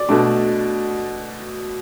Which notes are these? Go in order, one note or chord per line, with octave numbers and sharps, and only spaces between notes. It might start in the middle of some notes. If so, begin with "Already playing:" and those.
Already playing: D5
B2 A3 D4